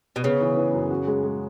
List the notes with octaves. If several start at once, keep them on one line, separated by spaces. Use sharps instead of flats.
B2
C#3 B3
E3
E3
F#2
F#4
G#3
G#3